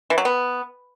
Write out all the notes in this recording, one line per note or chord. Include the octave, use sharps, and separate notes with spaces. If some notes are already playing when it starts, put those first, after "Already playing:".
E3
F#3
B3